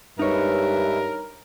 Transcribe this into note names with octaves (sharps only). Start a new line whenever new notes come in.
G2 G#3 D#4 A#4 B4 C#5 E5